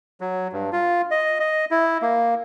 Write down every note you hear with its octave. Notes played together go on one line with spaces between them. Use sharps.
F#3
G2
F4
D#5
D#5
E4
A#3